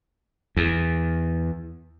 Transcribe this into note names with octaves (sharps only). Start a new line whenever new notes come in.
E2